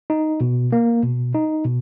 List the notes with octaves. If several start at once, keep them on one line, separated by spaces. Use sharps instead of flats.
D#4
B2
A#3
B2
D#4
B2